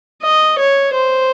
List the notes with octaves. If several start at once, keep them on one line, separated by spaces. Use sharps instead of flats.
D#5
C#5
C5